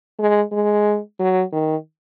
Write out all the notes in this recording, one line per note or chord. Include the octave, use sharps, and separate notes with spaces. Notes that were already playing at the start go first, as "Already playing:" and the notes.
G#3
G#3
F#3
D#3